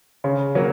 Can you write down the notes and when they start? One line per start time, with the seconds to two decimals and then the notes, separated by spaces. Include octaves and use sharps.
0.24 C#3
0.55 F#3 A#3